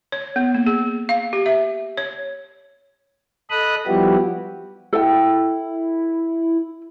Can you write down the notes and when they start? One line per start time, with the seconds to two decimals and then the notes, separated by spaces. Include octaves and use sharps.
0.12 C#5
0.36 B3
0.55 A#3
0.66 G#4
1.09 F5
1.33 G4
1.46 E5
1.97 C#5
3.50 A4 D#5 B5 D#6 F#6
3.87 F3 G3 B3 E4 F#4 G4
4.93 E4 A4 G5